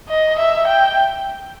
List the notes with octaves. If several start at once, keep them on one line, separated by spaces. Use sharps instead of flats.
D#5
E5
G5